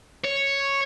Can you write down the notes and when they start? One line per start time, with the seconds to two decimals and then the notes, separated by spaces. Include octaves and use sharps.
0.25 C#5